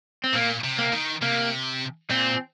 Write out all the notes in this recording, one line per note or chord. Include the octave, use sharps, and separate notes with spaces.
C4
A#2 A#3
C3
A#3
D#3
C3 A#3
A#2 C4